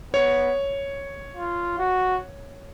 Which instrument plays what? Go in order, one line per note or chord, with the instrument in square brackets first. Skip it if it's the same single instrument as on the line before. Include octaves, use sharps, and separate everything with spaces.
[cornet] B3 [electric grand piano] C#5
[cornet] F4
F#4